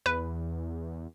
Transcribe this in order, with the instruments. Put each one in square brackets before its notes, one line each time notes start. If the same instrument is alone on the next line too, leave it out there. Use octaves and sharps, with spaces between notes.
[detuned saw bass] E2 [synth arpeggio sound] B4